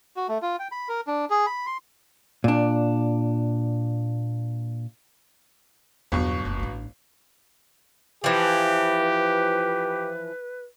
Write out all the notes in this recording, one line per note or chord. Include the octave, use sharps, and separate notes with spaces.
F#4
A3
F4
G5
B5
A#4
D4
G#4
B5
C6
A#2 D4
G1 E2 B2 F#3 C#6
F#1 D2
A1 D4
E3 F3 G4 B4